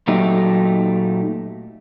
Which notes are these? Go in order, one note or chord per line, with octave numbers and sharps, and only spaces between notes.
A#2 F#3 A3 D#4 G4